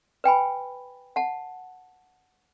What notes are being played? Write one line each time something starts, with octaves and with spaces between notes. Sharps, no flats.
B4 G5 G#5 B5
F#5 A5